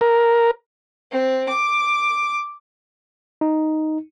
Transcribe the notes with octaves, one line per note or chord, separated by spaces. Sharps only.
A#4
C4
D6
D#4